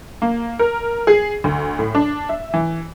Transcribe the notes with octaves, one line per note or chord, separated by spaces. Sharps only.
A#3
A#4
G#4
D2
A2
D4
E5
E3